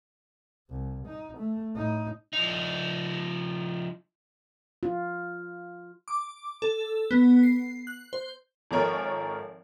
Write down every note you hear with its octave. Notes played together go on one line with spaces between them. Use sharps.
C2
D#4
A3
A2 D#4
F3 D#4
F4
D6
A4
B3
C7
F#6
C5
G#1 F3 A4 A#4 C#5 G#5